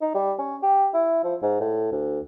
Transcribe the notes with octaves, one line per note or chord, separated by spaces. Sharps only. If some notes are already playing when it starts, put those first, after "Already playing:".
D#4
G3
C#4
G4
E4
F3
G#2
A2
D2